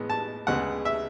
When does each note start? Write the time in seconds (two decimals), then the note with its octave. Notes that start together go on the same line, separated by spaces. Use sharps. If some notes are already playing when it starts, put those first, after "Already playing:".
Already playing: A2 E3 G#3 B3
0.10 A5
0.47 D2 C#3 G#3 B3 F#5
0.85 E5